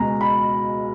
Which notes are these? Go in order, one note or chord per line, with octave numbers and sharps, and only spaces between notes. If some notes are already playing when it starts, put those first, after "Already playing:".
Already playing: C#2 B2 G#3 A#5
B5